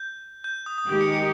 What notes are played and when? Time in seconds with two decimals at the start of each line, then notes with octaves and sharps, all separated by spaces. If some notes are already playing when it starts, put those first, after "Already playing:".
Already playing: G6
0.44 G6
0.66 D#6
0.78 D#6
0.89 D#3 G#3 D#4 G4 G6
1.01 C#7
1.12 C#7